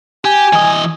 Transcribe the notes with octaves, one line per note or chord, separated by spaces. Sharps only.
G4 G#5
E3 D#5